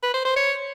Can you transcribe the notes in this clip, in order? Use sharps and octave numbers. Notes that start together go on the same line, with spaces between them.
B4
C5
C5
C#5